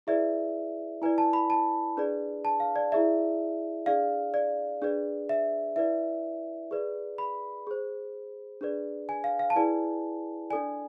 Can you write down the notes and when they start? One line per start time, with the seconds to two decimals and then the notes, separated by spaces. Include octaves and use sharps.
0.07 E4 G#4 B4 D5 E5
1.02 E4 B4 D5 G#5
1.18 A5
1.33 B5
1.50 A5
1.97 D4 G#4 B4 D5
2.45 A5
2.60 F5
2.76 D5
2.92 E4 G#4 D5 E5
3.86 D4 G#4 D5 F5
4.34 D5
4.82 D4 G#4 B4 D5
5.29 E5
5.76 E4 B4 D5 E5
6.71 G#4 B4 D5
7.18 B5
7.67 G#4 C5
8.61 D4 G#4 B4 D5
9.09 G#5
9.24 F5
9.39 F5
9.50 A5
9.56 E4 G#4 B4 D5 G#5
10.50 D4 A4 D5 G#5